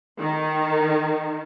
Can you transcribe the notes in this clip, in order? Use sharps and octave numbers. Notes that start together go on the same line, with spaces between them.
D#3